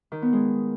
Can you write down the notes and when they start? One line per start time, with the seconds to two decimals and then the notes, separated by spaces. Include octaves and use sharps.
0.12 D#3
0.22 B3
0.33 G#3